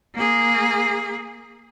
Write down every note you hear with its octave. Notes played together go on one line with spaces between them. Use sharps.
A#3 G#4